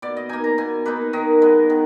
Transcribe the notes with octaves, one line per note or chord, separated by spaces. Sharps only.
B2 D5
D#5
A#3 D#4 G#5
A#5
B2 G#5
A#3 D#4 B4
D#3 D#5
G#3 B3
D#3